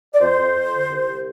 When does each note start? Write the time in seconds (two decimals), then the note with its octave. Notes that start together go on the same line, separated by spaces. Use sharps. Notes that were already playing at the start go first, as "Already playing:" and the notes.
0.14 D5
0.21 F2 C5
0.38 F2
0.55 F2
0.72 D3
0.89 C2
1.07 C2